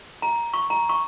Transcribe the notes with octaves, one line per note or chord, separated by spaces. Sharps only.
A#5
C#6
A#5
C#6